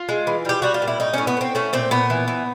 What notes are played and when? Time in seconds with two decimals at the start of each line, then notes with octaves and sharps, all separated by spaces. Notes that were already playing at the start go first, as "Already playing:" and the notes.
Already playing: F4
0.09 G#3
0.27 E3
0.45 G3 G4
0.62 G3 F#4
0.74 F4
0.82 A#2
0.88 E4
1.00 A2 D#4
1.14 A2 C#4
1.27 B3
1.37 A2 C4
1.55 A3 C#4
1.73 A#2 C4
1.91 A#2 B3
2.10 E3
2.28 E3